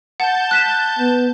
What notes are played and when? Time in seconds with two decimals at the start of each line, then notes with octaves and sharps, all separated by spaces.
0.20 F#5 A5 G6
0.51 F#6 B6 E7
0.99 B3